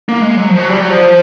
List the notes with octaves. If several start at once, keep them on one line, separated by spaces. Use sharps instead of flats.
A#3
G#3
F#3
F3
F#3
G3
F#3
F3